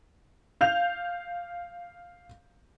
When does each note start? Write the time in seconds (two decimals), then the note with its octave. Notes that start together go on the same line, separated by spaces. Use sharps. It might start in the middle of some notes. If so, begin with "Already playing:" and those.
0.61 F5 G6 F7